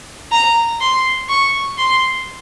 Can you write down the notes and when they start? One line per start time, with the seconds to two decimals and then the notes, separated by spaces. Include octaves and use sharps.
0.32 A#5
0.81 C6
1.29 C#6
1.78 C6